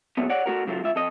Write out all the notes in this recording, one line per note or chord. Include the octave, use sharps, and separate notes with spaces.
A#2 C#3 F#3 A3 B3
C#5 D5 F#5
A3 F#4 A#4
C#3 F#3 A3 F4
C#2 F4 E5
F2 A4 D#5